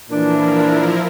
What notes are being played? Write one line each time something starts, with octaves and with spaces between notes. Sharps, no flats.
A#2 E3 F3 D4 E4 A#4